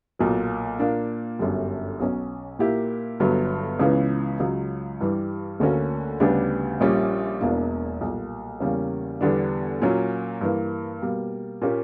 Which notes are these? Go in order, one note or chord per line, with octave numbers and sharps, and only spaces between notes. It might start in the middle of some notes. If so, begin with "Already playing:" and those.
B1 A#2 F#3
A#2 A#3 D4
G1 F#2 D3 G3
B1 B2 F#3 C#4
A#2 A#3 E4 G4
G1 G2 D3 F#3 B3
C#2 C#3 E3 B3
C#2 C#3 F#3
G2 E3 G3
D2 D3 A#3 C#4 F#4
D2 C#3 G3 B3 D4
A#1 A#2 G3 C#4
E1 E2 B2 A#3 D4
B1 A#2 G3
E2 C#3 G3 A#3 C#4
E2 D3 G3 B3 D4
A#2 F#3 C#4
G2 E3 A#3
B2 G3 A#3
A#2 A#3 C#4 G4